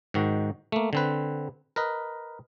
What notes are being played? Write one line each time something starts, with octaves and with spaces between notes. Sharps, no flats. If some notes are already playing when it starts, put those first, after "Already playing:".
G#2 D#3 F#4
A3 A#3
D3 C4 B4
A#4 B4 D#5